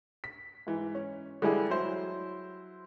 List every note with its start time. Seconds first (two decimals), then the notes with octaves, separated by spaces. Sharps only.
0.24 B6
0.67 G#2 E3
0.95 C#4
1.42 D3 E3 G3 G#3 E4 G#4
1.70 F#3 E4 C5